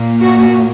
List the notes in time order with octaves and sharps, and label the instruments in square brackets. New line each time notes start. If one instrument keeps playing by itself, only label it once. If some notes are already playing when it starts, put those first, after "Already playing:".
Already playing: [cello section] A#2 A#3
F#4